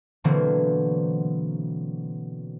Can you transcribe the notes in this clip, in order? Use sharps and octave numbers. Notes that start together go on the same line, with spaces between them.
B2 D3 E3 F#3 A#3 C4